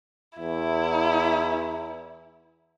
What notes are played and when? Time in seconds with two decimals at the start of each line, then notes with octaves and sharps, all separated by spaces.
0.38 E2 E4